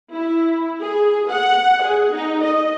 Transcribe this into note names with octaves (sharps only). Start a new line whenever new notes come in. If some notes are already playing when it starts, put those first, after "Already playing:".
E4
G#4
F#5
G#4
D#4
D#5